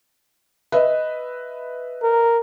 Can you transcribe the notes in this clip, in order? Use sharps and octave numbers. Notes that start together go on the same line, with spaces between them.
B4 D#5 E5
A#4